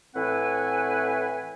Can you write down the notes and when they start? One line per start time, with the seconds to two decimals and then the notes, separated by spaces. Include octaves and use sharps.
0.15 A2 E3 C4 B4 F#5 G#5